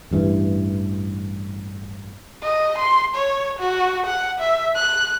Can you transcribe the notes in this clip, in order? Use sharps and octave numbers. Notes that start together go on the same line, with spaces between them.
A1 G2 E3
D#5
C6
C#5
F#4
F#5
E5
F#6